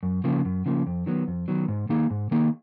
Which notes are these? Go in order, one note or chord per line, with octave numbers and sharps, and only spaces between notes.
F#2
C#3 F3 A#3
F#2
C#3 F3 A#3
F2
D#3 F#3 B3
F2
D#3 F#3 B3
G#2
D#3 A#3 D#4 G#4
G#2
D#3 A#3 D#4 G#4